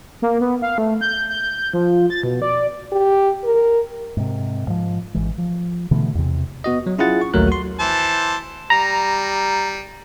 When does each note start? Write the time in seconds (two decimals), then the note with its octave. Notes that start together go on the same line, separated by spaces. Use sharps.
0.22 A#3
0.41 B3
0.62 F5
0.78 A3
1.01 G6
1.29 G6
1.74 F3
2.10 A6
2.23 B2
2.42 D5
2.92 G4
3.44 A#4
4.17 G#2 C3
4.67 G#2 F3
5.14 G#1 E3 G#3
5.38 F3
5.91 B2 D3 E3 A3
6.15 E2 C3
6.64 B3 F#4 D#5
6.86 F#3
6.98 C#4 E4 F4 G#4 F#5 A6
7.22 C#6
7.34 A#1 D#2 F#3 A3 A#4 F#6
7.48 F#4 C6
7.79 E3 C5 A5
8.70 G3 A#5